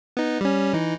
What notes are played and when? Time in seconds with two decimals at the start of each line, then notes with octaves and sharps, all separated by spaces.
0.17 B3 D#4
0.41 G3 C#4
0.73 E3 D#4